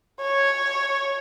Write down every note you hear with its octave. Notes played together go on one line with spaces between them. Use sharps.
C#5